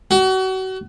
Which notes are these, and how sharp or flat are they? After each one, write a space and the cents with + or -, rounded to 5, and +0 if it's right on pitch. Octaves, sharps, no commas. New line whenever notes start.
F#4 +35